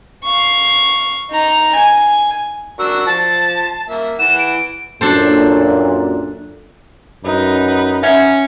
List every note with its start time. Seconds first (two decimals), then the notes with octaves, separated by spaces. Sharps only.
0.24 F5 C#6
1.31 D#4 A#5
1.75 G#5
2.79 D4 F#4 A#4 E6
3.06 F3 A5
3.89 A#3 E5
4.19 E3 F#5 E7
4.39 D7
5.01 F#2 A#2 D4 A4 C5
7.24 F#2 D#4 B4
8.03 C#4 E5 F#5